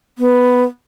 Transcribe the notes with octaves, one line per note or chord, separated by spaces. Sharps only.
B3